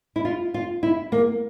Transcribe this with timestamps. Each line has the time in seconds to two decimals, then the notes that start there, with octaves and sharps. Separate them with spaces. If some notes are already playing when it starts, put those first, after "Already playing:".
0.16 E4
0.25 F4
0.54 F4
0.83 E4
1.12 A#3